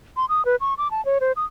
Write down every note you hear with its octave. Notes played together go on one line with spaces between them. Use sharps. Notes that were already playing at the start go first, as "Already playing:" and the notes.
C6
D#6
B4
C#6
D6
A5
C#5
C5
D#6